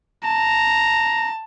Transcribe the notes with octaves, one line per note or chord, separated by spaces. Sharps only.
A5 A#5